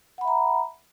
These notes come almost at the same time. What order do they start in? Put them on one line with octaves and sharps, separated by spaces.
F#5 B5 E5 A#5